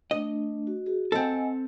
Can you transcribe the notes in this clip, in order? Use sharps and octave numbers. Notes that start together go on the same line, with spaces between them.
A3 D4 D#5
F#4
F#4 G#4
C4 A4 D#5 F#5 G#5